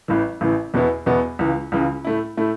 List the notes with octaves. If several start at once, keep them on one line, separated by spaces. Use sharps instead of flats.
A1 A2 E3
A1 A2 E3
E2 B2 B3 E4
E2 B2 B3 E4
C#2 C#3 E3
C#2 C#3 E3
A2 A3 E4
A2 A3 E4